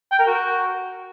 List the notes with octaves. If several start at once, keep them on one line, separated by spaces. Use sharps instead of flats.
G5
A#4
F#4